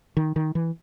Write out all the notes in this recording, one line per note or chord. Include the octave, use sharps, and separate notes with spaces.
D#3
D#3
E3